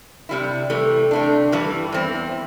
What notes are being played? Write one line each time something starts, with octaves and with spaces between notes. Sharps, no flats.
C3 G3 E4
C3 E3 A3
C3 A3 D4
G2 E3 G3
E2 E3 C4